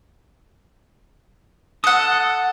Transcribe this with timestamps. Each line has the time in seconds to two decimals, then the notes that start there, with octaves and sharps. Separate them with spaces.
1.84 A4 F#5 D#6